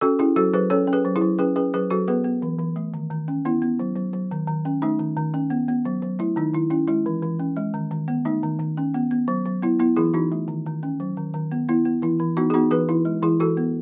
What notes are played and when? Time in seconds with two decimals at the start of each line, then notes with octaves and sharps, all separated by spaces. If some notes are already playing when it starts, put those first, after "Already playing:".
0.01 C#4 F#4 A4
0.19 C#4 E4 G#4
0.36 F#3 F#4 A4
0.54 F#3 G#4 B4
0.70 C#4 A4 C#5
0.87 C#4
0.93 G#4 B4
1.05 F#3
1.16 E4 G#4
1.21 F#3
1.39 C#4 G#4 B4
1.56 C#4 G#4 B4
1.74 F#3 G#4 B4
1.90 F#3 F#4 A4
2.08 B3 G#4 B4
2.24 B3
2.42 E3
2.59 E3
2.76 A3
2.94 D#3
3.11 D#3
3.28 C#4
3.45 B3 E4
3.62 B3
3.79 F#3
3.96 F#3
4.13 F#3
4.31 D#3
4.47 D#3
4.65 C#4
4.82 A3 D#4
4.99 D#3
5.17 D#3
5.34 C#4
5.50 B3
5.68 B3
5.85 F#3
6.02 F#3
6.19 A3 E4
6.36 D#3 D#4
6.54 D#3 E4
6.70 C#4 E4
6.88 G#3 E4
7.06 E3
7.22 E3
7.40 C#4
7.57 G#3
7.74 D#3
7.91 D#3
8.08 B3
8.25 A3 D#4
8.43 D#3
8.59 D#3
8.77 C#4
8.94 B3
9.11 B3
9.28 F#3
9.46 F#3
9.62 B3 E4
9.79 B3 E4
9.97 E3 E4 G#4
10.14 E3 D#4 F#4
10.32 A3
10.48 D#3
10.66 D#3
10.83 C#4
11.00 F#3
11.17 D#3
11.34 D#3
11.52 B3
11.69 B3 E4
11.85 B3
12.02 E3 E4
12.20 E3
12.37 B3 D#4 F#4
12.50 G#4
12.54 B3 D#4 F#4
12.71 E3 G#4 B4
12.89 E3 E4
13.05 G#3
13.22 E3 E4 G#4
13.40 E3 F#4 A4
13.57 B3